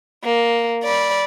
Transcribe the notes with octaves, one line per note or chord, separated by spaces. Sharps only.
A#3
D5 B5